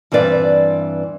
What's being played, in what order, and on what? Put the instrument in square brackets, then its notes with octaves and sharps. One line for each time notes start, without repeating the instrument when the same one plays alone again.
[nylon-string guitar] G2 E3 C4 B4 D5 F5